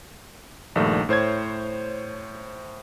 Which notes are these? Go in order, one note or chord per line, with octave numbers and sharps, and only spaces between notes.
A#1 G2 D#3 A3
A2 C5 C#5 G#6